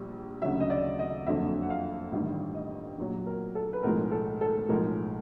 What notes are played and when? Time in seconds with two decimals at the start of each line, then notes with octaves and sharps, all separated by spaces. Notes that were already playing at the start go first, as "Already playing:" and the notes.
Already playing: A#1 A#2 G3
0.42 D2 C#3 F#3 E5
0.60 D#5
0.70 D5
0.99 D#5
1.27 F#1 F2 D3 F#3 E5
1.62 F#5
1.70 F5
2.12 A1 G2 D#3 G3 E5
2.55 D#5
2.98 A#1 A#2 F#3
3.26 A#4
3.55 A4
3.73 B4
3.83 B1 A2 F3 G#3 A#4
4.11 A4
4.41 A4
4.69 B1 A2 F3 G#3 A#4